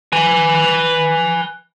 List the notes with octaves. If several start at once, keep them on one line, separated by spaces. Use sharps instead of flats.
B4 G#5